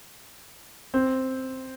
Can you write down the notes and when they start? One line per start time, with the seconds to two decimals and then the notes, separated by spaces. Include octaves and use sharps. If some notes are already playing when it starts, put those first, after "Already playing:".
0.94 C4